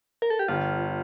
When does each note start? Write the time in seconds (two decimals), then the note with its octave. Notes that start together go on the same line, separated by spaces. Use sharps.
0.22 A#4
0.30 A4
0.39 G4
0.48 G1 F4